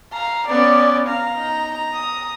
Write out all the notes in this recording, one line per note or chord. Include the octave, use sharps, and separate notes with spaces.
F5 A#5
B3 C#4 D5
F5 A#5
D#4
D#6